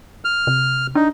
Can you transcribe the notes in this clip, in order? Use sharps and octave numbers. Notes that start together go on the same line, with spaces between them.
F6
C3
D4 D#4